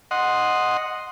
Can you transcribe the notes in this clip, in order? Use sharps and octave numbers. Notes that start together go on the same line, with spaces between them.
D#5 F#5 C6